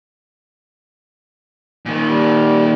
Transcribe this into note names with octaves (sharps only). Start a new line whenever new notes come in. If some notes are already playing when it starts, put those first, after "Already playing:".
A#2 D#3
G3